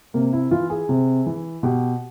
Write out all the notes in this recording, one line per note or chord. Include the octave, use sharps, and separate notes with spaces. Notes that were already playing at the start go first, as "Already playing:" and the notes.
C3 A#3
E4
E3 F4
G#4
C3
E3
B2 G4